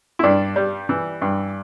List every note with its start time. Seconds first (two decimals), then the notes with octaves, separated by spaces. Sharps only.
0.19 E4
0.23 G2 D4
0.56 G3
0.89 E3
1.22 G2